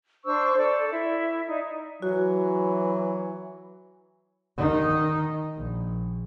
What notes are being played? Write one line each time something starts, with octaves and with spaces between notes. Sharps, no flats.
D4 C5 C#6 E6
A4 D5
E4 E5
D#4 D5
E3 F#3 F#4
D#3 D#4
A#1